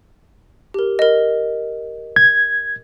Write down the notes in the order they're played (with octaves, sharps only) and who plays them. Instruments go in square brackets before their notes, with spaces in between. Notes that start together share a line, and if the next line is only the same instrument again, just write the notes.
[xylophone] G4 A#4
A#4 D#5
[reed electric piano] G#6